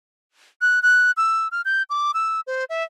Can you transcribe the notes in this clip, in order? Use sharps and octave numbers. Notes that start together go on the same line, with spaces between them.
F#6
F#6
E6
F6
G6
D6
E6
C5
E5